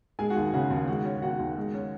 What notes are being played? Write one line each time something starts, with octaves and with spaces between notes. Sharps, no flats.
G#3 G#4 G#5
F#4 F#5
D#2
C#3 F#4 F#5
D#2
G#3 F#4 F#5
C#4
D#3 F#4 F#5
D#2
G#3
C#4